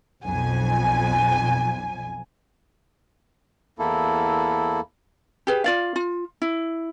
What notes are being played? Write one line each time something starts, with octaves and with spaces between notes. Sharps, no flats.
B1 F2 G#5
E2 A#3 E4 A4
G4 G#4 B4
F4 D5 F5
F4
E4